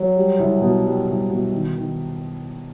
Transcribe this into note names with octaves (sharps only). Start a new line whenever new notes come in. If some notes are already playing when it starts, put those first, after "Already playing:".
Already playing: F#3
G3
C2
B2
G3
C2
B2
D#3
D#3